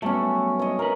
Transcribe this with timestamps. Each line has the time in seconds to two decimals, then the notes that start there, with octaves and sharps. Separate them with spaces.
0.02 F#3 G3 A3 B3 C#4
0.59 C#5 D#5
0.79 A#3 A#4 B4